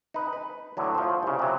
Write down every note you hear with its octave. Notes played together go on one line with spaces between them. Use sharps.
D#4 B4
B4
A2 D3 F#3
F3 C5
C2 C#3
C3 F#3